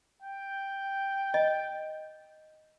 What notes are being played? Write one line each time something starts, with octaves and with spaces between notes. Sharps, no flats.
G5
D#5